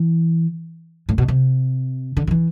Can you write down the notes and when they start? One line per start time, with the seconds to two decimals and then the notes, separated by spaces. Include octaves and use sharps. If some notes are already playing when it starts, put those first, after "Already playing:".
Already playing: E3
1.09 A2
1.18 B2
1.28 C3
2.17 D3
2.27 D3
2.31 E3